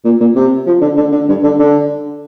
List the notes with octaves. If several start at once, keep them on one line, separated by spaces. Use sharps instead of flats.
A#2
A#2
C3
F3
D3
D3
D3
G2
D3
D3